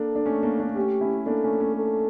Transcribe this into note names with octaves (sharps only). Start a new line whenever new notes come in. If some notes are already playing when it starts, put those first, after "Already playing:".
Already playing: A#3 D4 A4
D4
A3 C#4
A#3 D4
A#3 D4
A3 C#4 G4
C#4 E4
A#3 D4 A4
A3 C#4
A3 C#4
A4